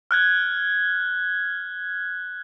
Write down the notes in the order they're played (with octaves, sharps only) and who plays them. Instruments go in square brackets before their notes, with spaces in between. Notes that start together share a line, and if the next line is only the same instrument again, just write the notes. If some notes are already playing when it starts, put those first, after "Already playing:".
[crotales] F6 F#6 G#6